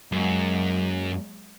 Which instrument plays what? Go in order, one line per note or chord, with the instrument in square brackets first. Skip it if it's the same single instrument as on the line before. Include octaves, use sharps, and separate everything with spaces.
[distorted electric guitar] F#2 [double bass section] F#3 G#3 A#3